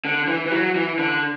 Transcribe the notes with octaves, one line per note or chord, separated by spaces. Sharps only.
D3
E3
E3
F#3
E3
D3